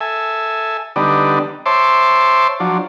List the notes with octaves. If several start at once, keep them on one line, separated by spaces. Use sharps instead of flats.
A4 E5 G#5
D3 G3 B3 D4 D#4
C5 C#5 E5 A5 C6 D6
F3 F#3 D4